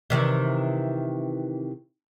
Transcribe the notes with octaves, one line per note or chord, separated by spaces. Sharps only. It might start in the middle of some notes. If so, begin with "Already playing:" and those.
C3 D#3 E3